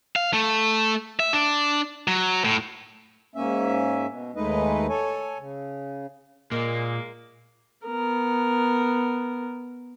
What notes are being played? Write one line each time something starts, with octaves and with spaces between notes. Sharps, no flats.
F5
A3
E5
D4
F#3
A2
G#2 A#3 C#4 E5
B2
D#2 G#3 A3 D#4 B4 D#5
A4 C#5 G#5
C#3
A#2 G#3 A#3
B3 A#4